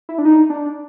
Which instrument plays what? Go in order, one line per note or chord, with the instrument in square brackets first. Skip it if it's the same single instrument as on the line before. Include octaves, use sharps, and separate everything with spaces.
[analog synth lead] E4
D4
D#4
D4